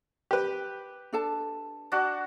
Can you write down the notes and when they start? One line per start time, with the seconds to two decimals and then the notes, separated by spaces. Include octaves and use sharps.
0.31 G4 B4
1.13 D4 A4 A5
1.92 D4 F#4